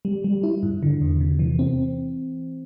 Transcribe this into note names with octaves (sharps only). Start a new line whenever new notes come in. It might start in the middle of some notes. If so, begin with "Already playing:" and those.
G3
G3
E4
G2
D3
E2
C3
E3
C4